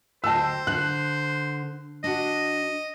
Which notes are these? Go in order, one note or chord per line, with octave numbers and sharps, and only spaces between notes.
D2 C5 D#5 G5 A5 E6
D3 F#6
D4 F#4 D#5